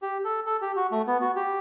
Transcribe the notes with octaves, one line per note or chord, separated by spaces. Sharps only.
G4
A4
A4
G4
F#4
A3
B3
F#4
G4